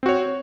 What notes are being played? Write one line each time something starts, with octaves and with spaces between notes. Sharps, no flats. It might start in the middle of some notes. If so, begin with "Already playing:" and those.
C4 F#4 C#5